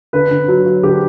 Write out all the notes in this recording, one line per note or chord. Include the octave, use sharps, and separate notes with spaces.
D3 B4
D3
F#3
F#3
D3 G4